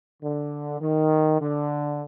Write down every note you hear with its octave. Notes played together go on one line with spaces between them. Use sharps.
D3
D#3
D3